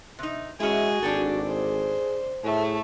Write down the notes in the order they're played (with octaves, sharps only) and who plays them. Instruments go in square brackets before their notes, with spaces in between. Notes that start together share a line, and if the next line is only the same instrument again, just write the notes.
[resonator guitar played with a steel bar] C3 D#4
[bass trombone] G#3 [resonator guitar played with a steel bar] C#4 E4 [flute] F#4 [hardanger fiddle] G#4
[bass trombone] G#1 [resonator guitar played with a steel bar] D4 G4 A4
[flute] G#4 [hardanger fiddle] C5
[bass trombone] A2 [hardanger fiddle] A3 [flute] G#4